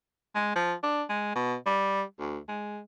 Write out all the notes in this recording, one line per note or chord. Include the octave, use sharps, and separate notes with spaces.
G#3
F3
D4
G#3
B2
G3
D2
G#3